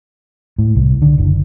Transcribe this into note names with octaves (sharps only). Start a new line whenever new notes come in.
A2
C2
D3
F#1